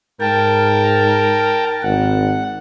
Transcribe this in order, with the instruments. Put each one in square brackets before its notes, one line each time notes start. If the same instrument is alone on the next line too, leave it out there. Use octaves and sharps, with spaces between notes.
[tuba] G#2 [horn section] A#4 [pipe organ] G5 A5
[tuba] G#1 [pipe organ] F#5